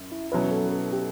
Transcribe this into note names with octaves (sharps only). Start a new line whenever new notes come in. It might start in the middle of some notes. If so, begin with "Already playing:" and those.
Already playing: F#2
E4
B2 F#3 C#4 E4 B4
A4
A4
G4